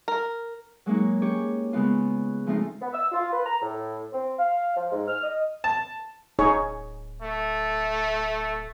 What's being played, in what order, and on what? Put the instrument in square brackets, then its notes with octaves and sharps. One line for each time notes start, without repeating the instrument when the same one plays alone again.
[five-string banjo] A#4
[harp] F#3 G#3 A#3 D#4 C#5
C#4 G4 C#5
C#3 G#3 B3 F4
F3 G#3 A3 C4 D#4 F4
[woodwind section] B3
E6
F4
B4
A#5
A2
C4
F5
F3
G#2
F6
D#5
[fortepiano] A5
[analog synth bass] D1 [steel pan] D#4 G#4 C#5
[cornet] A3